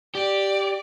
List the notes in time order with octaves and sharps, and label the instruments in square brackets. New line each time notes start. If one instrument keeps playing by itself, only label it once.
[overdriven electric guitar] G4 [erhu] D5